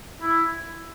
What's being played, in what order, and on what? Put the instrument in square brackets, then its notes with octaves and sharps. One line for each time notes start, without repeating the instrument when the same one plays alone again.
[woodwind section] E4